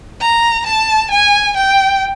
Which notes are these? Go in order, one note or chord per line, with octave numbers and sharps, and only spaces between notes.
A#5
A5
G#5
G5